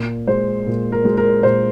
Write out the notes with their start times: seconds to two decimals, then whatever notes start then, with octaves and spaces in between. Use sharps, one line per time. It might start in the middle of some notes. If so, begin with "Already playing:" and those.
Already playing: A#2
0.27 G#3 C5
0.67 A#2
0.92 A#4
1.05 G#3
1.17 A#4
1.43 A#2 C5